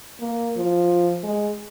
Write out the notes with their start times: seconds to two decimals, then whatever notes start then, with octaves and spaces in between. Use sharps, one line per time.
0.20 A#3
0.57 F3
1.23 G#3